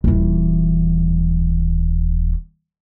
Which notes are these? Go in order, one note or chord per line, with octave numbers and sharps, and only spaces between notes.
D#1 E3